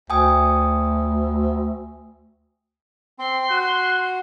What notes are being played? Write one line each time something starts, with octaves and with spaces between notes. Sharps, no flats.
D2 G5 G#5 D#6
C4 C6
F#4 F#6